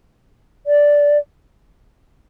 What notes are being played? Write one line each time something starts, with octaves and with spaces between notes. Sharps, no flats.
D5